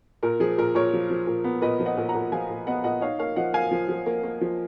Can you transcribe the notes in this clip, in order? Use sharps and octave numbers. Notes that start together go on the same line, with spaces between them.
A#2 A#4
F3 G#4
A#2 A#4
A#2 A#4 C#5
F3
F3
A#2
B3
A#2 B4 D#5
F3
D#5 F#5
A#2
F#5 A#5
A#2
F3 F5 G#5
A#2
B3 D#5 F#5
A#2 D#5 F#5
D#4 C#5 F5
A#3 C#5 F5
F3 D#5 F#5
A#3 F5 G#5
F3
F3
A#3
A#3
F3